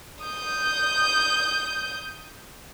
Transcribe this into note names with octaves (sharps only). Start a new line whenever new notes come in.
D#6 G6